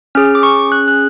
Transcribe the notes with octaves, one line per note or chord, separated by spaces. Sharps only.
C#4 G#4 F6
D6
C#6
F#6
F#6